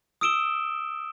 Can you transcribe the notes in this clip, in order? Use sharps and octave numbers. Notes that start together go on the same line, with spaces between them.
D#6 E6 D7 E7 G7